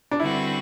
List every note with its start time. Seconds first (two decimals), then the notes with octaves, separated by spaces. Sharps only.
0.11 D4
0.20 D3 G3 C4 E4 F#4 B4